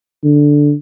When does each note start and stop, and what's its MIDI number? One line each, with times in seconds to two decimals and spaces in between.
0.24 0.73 50